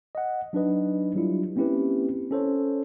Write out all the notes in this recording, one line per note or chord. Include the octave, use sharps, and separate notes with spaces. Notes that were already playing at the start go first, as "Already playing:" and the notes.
D#5 F#5
F#3 D4 D#4 B4 D#5
F#3 G3 D4 E4 F4
A#3 C4 C#4 E4 G4 B4
C#4 A4 C5 C#5